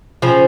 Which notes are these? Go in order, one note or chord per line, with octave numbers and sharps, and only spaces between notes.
C#3 F3